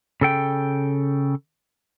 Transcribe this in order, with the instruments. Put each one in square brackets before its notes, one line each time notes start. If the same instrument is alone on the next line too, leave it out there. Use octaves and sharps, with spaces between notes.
[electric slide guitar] C#3 A4 G5